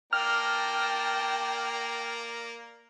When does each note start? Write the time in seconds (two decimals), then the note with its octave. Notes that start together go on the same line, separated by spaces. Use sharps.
0.13 A#3 D5 G5 A5 A#5 F6